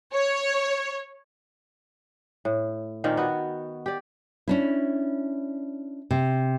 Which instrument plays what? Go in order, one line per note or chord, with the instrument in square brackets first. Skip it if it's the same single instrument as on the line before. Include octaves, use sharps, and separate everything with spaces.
[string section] C#5
[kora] A2
A#2 D#3 A#3 C4
B3 F#4
G4 D5
[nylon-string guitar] C#4 D4 E4
C3